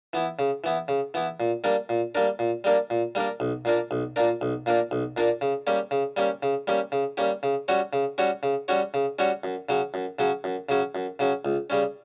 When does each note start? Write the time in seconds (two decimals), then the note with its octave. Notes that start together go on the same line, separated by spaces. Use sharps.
0.13 E3 B3 E4
0.39 C#3
0.64 E3 B3 E4
0.88 C#3
1.14 E3 B3 E4
1.40 A#2
1.64 G3 A#3 D4 A#4
1.89 A#2
2.15 G3 A#3 D4 A#4
2.39 A#2
2.64 G3 A#3 D4 A#4
2.90 A#2
3.15 G3 A#3 D4 A#4
3.40 B1
3.65 A#2 A#3 D4 A#4
3.91 B1
4.16 A#2 A#3 D4 A#4
4.41 B1
4.66 A#2 A#3 D4 A#4
4.91 B1
5.17 A#2 A#3 D4 A#4
5.41 C#3
5.67 G3 A#3 C#4 G4
5.91 C#3
6.17 G3 A#3 C#4 G4
6.43 C#3
6.67 G3 A#3 C#4 G4
6.92 C#3
7.17 G3 A#3 C#4 G4
7.43 C#3
7.68 G3 C#4 F#4 C#5
7.93 C#3
8.18 G3 C#4 F#4 C#5
8.43 C#3
8.68 G3 C#4 F#4 C#5
8.94 C#3
9.19 G3 C#4 F#4 C#5
9.44 F#2
9.69 C#3 F#3 C#4
9.94 F#2
10.19 C#3 F#3 C#4
10.44 F#2
10.69 C#3 F#3 C#4
10.95 F#2
11.19 C#3 F#3 C#4
11.45 C#2
11.70 C#3 G3 C#4